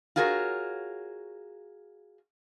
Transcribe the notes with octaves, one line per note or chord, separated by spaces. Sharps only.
F4 F#4 G#4 A#4 C#5